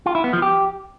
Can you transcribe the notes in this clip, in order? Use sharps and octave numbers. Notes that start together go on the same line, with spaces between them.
F4
E4
B3
F3
G4